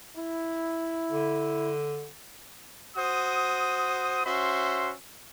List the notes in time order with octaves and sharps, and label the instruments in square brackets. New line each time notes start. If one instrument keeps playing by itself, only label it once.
[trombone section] E4
[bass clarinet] D3
[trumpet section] F#4 C5 D#6
C#4 F#4 C5 E5 C6